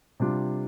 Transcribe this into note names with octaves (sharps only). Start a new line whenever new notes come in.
C3 G3 D4 F4